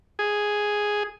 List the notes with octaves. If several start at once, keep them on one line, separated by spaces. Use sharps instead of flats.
G#4